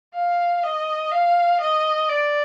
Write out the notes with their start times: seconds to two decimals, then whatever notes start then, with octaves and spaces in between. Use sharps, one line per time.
0.14 F5
0.63 D#5
1.12 F5
1.61 D#5
2.09 D5